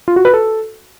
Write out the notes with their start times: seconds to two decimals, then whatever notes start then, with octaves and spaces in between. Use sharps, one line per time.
0.08 F4
0.16 F#4
0.25 B4
0.34 A4